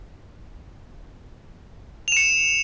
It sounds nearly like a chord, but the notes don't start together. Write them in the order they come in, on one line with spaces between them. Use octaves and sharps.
F7 E7 C#7